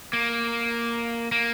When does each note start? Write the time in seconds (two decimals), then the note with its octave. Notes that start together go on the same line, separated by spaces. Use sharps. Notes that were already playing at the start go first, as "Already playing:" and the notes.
0.13 A#3
1.32 A#3